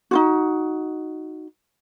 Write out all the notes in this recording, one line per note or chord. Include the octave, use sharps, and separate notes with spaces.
D#4 F4 F#4